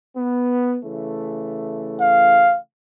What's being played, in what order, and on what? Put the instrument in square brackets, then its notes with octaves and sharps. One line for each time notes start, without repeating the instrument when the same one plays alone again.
[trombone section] B3
C#3 E3 A3
[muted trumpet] F5